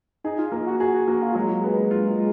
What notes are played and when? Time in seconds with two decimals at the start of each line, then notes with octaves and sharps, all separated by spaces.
0.24 D#4 G#4
0.38 F4
0.52 A#3
0.66 F#4
0.80 F#4 G#4
0.93 F#4
1.08 A#3 F#4
1.22 F4
1.35 F#3 G#3
1.64 B3
1.91 F4